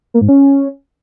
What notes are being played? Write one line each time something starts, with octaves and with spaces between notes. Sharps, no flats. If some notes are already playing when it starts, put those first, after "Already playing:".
A#3
G#2
C#4